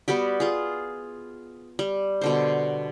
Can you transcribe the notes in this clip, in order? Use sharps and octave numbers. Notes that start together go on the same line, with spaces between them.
G3 B3 F#4 G4
F4 G#4
G3
B2 D3 C5